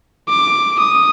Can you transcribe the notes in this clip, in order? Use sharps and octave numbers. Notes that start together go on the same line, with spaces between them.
D6
D#6